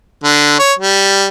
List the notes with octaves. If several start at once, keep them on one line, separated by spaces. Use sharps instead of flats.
D3
C#5
G3